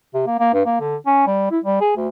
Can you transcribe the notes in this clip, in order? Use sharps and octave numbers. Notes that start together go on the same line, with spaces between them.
C3
A#3
A#3
G2
A#3
D3
C#4
G3
E4
G3
G#4
D2